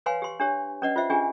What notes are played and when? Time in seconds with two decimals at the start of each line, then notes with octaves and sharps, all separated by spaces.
0.06 B4 C#5 F5 F#5 G#5 C6
0.22 G4 C6
0.40 D4 G4 C#5
0.82 C#4 B4 D5 D#5 F#5
0.96 F4 C5 E5 F#5
1.10 C#4 D4 F4 G4 G#4 G#5